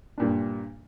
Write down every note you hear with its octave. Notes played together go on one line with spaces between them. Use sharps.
G2 A#2 D4